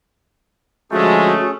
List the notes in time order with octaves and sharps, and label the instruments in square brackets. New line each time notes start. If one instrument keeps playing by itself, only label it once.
[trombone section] D3 F3 G#3 [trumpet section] A3 [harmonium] C#4 G#4 [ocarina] F#4